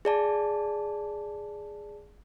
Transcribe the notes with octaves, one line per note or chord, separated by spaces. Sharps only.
G#4 D5 A5